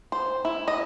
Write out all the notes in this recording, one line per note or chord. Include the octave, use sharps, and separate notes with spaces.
C5
E4
D#5